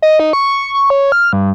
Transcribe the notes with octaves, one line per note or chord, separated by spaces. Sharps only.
D#5
D#4
C#6
C#6
C#5
F6
G2